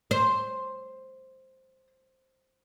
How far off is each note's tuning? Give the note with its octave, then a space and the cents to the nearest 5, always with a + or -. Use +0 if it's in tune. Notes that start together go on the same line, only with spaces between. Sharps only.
C5 +5